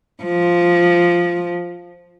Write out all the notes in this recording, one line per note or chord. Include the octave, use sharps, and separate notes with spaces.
F3